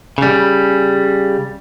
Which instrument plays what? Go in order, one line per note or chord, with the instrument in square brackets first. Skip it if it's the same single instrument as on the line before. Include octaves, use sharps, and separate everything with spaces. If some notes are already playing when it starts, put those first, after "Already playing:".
[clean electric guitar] C#3 G3